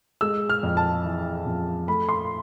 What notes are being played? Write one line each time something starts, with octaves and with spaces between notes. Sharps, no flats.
G#3 E6
F6
F2
A5
E3
F2
A3 B5
C6